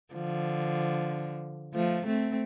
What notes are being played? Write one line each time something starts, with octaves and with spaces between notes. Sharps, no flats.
D3 F3
F3 A3
A3 C4